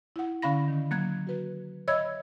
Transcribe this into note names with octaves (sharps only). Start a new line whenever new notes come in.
E4 F#5
D3 C#4 F5 B5 A#6
D#3
F#3 A#3 F#6 G#6
F#4 B4
C#5 D#5 E5 B5 E6 G#6